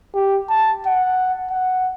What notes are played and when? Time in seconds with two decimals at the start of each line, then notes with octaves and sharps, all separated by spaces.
0.14 G4
0.49 A5
0.86 F#5
1.51 F#5